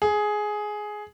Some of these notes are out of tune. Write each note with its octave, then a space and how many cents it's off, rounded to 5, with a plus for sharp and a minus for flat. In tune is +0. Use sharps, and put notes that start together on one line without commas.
G#4 +10